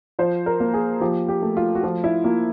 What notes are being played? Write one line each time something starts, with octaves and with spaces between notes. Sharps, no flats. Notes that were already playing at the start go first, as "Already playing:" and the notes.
F3 C5
A#4
A#3
G#4
F3 G4
G4
A3
F4
F#4
F3 F4
E4
A#3 F4